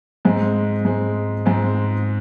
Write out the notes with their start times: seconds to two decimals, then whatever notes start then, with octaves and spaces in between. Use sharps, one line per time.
0.25 G#2 G#3 C4
0.85 G#2 G#3 C4
1.46 G#2 G#3 C4